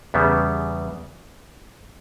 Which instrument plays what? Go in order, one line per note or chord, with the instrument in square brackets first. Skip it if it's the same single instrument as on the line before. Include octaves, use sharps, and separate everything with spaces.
[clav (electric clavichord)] E2 C#3 G3 B3